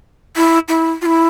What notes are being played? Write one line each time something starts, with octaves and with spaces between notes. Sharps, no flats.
E4
E4
F4
E4